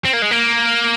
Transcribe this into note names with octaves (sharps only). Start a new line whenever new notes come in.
C4
A#3
G#3
A#3